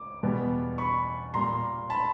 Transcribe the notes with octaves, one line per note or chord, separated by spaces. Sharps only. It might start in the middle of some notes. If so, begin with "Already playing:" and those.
Already playing: D6
E2 B2 G3 B3
B5 C#6
A#2 G3 A#3 A#5 C6
A5 B5